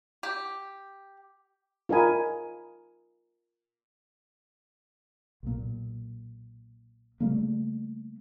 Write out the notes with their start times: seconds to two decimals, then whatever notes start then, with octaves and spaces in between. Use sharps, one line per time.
0.23 G4
1.89 F4 A#4 D#5 G#5 B5
5.43 B1 A#2
7.20 C#3 G3 A3 A#3